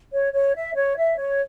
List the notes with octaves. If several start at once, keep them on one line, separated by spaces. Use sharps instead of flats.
C#5
C#5
E5
C#5
E5
C#5